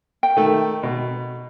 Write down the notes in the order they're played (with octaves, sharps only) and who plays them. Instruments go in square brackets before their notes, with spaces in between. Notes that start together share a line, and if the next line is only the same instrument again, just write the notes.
[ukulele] G5
[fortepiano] D#3 A3
B2